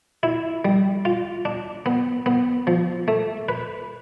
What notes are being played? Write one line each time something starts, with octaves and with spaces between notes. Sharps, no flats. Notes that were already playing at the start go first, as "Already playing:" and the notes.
E4
G3
F4
D4
B3
B3
F3
A3
B4